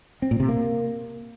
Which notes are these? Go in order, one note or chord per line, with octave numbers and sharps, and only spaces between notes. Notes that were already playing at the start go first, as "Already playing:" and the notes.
C4
A#2
C3
A#3